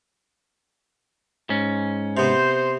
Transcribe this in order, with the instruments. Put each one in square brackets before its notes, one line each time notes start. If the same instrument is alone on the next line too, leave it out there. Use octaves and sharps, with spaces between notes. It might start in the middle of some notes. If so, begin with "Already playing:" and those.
[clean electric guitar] G#2 C#4
[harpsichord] C3 B3 [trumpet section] C5